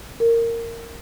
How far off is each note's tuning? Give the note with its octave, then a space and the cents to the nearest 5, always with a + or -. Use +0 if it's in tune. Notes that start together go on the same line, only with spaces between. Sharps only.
A#4 -15